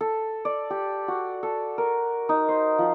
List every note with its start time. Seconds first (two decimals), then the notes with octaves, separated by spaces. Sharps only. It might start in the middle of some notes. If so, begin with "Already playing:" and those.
0.01 A4
0.45 D5
0.70 G4
1.08 F#4
1.43 A4
1.78 A#4
2.29 D#4
2.49 C5
2.79 F3